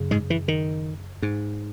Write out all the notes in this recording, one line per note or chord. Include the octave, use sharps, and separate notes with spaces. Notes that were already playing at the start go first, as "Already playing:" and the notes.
Already playing: F#2 C#3
G#2 G#3
E3
D#3
G#2